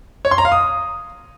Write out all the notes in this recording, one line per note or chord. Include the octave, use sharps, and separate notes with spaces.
C#5
C6
A#5
F5
D#6